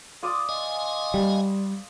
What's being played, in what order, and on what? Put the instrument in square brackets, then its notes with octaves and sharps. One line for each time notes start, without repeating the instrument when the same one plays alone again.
[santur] F4 D5 D#6
[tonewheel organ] D#5 F5 G#5
[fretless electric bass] G3